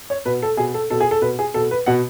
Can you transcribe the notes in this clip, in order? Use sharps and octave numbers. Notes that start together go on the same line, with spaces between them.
C#5
B2 B4
A4
B2 G#4
A4
B2 A4
G#4
A4
B2 B4
G#4
B2 A4
B4
B2 F#5